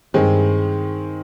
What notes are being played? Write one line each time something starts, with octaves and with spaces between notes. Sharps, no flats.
G2 D#3 G#3 C4